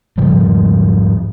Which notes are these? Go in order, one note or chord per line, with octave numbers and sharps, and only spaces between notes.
G#2 C#3 F3 G3